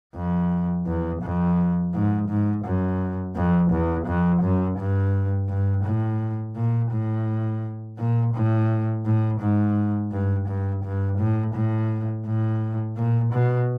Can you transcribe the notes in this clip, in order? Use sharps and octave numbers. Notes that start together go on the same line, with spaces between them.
F2
E2
F2
G#2
G#2
F#2
F2
E2
F2
F#2
G2
G2
A2
A#2
A2
A#2
A2
A2
G#2
G2
G2
G2
A2
A2
A2
A#2
B2